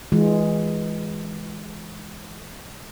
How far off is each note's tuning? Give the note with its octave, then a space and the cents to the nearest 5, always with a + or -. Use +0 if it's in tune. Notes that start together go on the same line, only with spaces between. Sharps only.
E3 -15 G#3 +0 F4 +35